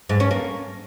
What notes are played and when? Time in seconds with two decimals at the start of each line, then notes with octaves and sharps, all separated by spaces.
0.09 G#2
0.20 C#4
0.31 A#3